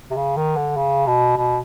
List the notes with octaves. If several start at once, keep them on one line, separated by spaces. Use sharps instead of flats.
C3
C#3
D#3
D3
C#3
B2
B2